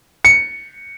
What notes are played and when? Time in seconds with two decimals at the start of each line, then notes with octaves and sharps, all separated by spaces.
0.25 C#7